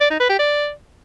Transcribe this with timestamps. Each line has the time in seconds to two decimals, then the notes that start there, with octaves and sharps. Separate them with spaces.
0.01 D5
0.10 D#4
0.20 B4
0.29 G4
0.39 D5